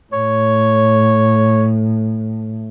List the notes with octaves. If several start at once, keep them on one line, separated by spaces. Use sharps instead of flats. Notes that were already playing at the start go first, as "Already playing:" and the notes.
A2 C#5